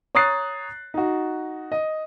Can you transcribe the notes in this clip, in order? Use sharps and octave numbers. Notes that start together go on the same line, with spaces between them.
C#5 A#5 D#6 F#6 A6 C7
D#4 F#4
D#5